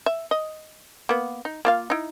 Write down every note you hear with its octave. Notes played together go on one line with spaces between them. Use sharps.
E5
D#5
A#3 B3
D#4
A#3 F4 F5
D#4 E4